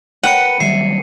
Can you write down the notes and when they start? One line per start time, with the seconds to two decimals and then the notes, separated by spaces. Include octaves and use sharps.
0.23 A#4 B4 F#5 G5 C#7 D#7
0.60 D#3 F#3 G3 E5 C7